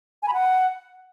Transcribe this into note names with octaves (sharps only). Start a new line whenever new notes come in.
G#5
B5
F#5